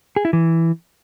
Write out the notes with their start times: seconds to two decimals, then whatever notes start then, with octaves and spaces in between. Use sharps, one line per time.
0.16 G#4
0.25 E4
0.33 E3